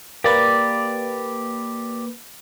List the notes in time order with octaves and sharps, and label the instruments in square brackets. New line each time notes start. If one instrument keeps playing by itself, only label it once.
[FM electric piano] A#3 B4 [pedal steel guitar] G4 D5